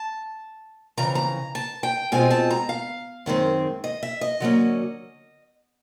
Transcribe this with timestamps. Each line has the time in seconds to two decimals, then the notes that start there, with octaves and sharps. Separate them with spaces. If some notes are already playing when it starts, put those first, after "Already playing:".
Already playing: A5
0.97 F2 C#3 E3 A#5
1.15 A#5
1.55 A5
1.83 G5
2.12 B2 G#3 C4 F4 G#5
2.31 A5
2.50 A#5
2.69 F5
3.26 F#2 D#3 G#3 C4
3.84 D#5
4.03 E5
4.21 D#5
4.40 D3 F#3 A#3 C#4